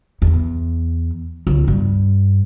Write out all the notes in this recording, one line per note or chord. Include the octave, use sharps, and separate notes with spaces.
E2
C#2
G2